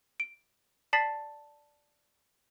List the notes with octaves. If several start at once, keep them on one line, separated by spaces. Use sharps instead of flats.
D7
D5 A5 A6 B6 C7 F#7